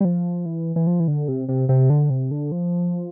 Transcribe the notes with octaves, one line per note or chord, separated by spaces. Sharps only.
G3
F3
E3
E3
F3
E3
D3
C3
C3
C3
D3
C3
D3
F3